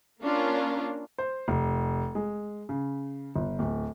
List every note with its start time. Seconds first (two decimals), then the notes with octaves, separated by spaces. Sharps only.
0.21 A#3 C#4 D4 F4 A#4
1.18 C5
1.48 F1
2.15 G#3
2.69 C#3
3.36 G1
3.59 D1